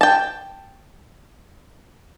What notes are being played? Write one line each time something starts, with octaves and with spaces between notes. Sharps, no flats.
G5 A5